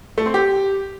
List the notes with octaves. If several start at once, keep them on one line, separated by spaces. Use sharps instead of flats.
A3
C4
G4